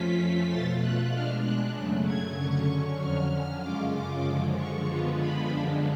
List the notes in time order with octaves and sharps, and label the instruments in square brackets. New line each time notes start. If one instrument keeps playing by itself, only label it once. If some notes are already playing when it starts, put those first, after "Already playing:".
Already playing: [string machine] F2 F3 A3 C#4 F4 B6
B2 A3 F4 A6
F#6
B2 G#3 D4 F6
F#6
F#2 C#3 F#3 A3
G#6
D3 F#3 C#4 C#6
F2 D3 F#3 C#4 F6
F#2 C#3 G#3 C#4 F4 D6
D6
F#2 D3 F3 G#3
C#6
D3 F3 G#3 B3 F4
B5
F#2 D3 G#3 D4